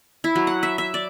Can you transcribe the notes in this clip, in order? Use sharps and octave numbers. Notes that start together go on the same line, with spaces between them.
E4
F#3
F#5
E5
E5
D5